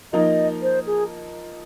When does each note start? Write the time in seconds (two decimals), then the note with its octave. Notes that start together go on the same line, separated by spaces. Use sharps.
0.13 F3 A#3 D#4 D#5
0.62 C5
0.87 G#4